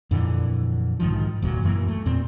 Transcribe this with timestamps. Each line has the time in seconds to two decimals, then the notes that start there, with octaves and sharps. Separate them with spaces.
0.11 F2 A#2 D3 E3
1.00 B1 G#2 D#3 F3
1.42 F#1 D2 A#2 F#3
1.64 F#2 E3 A#3
1.88 A3
2.06 E2 A#2 C4